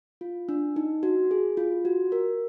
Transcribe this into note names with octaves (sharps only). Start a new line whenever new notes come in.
F4
D4
D#4
F#4
G#4
F4
F#4
A#4